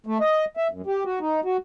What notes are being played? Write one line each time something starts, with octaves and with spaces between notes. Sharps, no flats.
A3
D#5
E5
F#2
G4
F#4
D#4
F#4